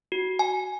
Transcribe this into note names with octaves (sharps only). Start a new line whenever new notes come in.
F#4
G#5